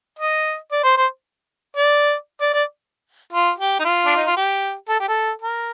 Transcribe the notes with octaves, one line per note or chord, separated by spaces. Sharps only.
D#5
D5
C5
C5
D5
D5
D5
F4
G4
D#4
F4
D4
D#4
F4
G4
A4
G4
A4
A#4